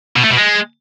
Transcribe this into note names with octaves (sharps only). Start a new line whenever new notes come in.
B2
A3
B2
G#3